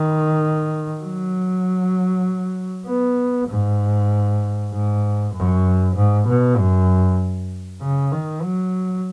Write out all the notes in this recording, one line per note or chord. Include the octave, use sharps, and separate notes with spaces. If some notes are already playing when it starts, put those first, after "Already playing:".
Already playing: D#3
F#3
B3
G#2
G#2
F#2
G#2
B2
F#2
C#3
D#3
F#3